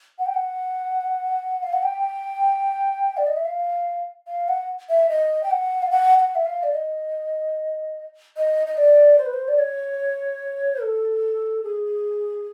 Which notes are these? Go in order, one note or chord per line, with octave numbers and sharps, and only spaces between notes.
F#5
G5
F#5
F5
F#5
G5
D5
D#5
E5
F5
F5
F#5
E5
D#5
G5
F#5
F5
F#5
F#5
E5
F5
D5
D#5
D#5
D#5
D5
C5
B4
C5
D5
C#5
A4
G#4